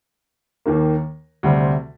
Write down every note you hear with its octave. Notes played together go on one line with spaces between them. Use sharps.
D#2 D#3 A#3
D2 C3 G3 C4